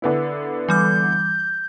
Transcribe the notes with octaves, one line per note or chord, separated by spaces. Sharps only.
D3 B3 E4
E3 G3 D6 G6